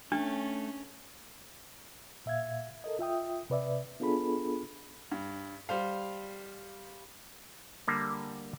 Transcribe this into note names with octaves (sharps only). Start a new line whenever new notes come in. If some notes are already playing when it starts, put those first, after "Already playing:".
A3 C#4 D4
A#2 E5 F5 G#6
A4 A#4 D#5
F4 E5 G5 D#6
C3 B4 D5 E5
B3 D4 F4 G#4 A4 B5
G2
G3 C5 F5
D3 G3 A#3